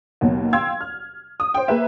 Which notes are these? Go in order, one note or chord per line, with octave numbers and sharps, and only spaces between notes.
D#2 B2 F#3
F5 G5 C6 E6 G#6
F6
D#6
C5 G5
A#3 G#4 B4 E5